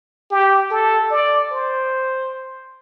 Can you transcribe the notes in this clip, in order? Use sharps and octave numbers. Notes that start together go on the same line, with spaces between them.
G4
A4
D5
C5